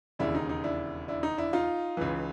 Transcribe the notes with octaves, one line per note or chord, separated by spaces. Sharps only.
E1 D#2 C#3 D4 E4
D#4
D#4
D4 E4
D4 E4
D#4
D4 E4
D#4 F4
C#2 C#3 E3